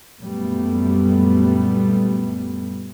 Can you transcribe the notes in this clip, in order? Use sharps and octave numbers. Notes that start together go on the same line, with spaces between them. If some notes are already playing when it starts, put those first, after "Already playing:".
F#2 A#2 G3 A3 B3